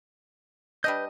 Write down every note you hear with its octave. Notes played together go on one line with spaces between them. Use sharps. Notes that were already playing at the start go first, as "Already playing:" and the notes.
G3 D4 B4 D#5 G6